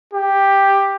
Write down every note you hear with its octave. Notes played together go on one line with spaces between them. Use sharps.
G4